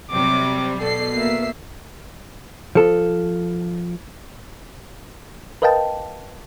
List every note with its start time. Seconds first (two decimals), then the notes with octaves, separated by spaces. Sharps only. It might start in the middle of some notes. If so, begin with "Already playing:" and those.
0.11 C3 F#3 G3 D6
0.80 B2 A4 D5 C7
1.16 A#3 E5
2.75 F3 A4
5.62 A#4 B4 D#5 F5 G5 A5